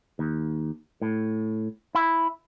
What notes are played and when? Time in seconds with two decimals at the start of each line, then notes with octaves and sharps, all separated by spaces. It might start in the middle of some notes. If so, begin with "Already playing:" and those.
0.19 D#2
1.02 A2
1.95 E4